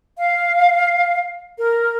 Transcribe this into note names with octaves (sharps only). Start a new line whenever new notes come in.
F5
A#4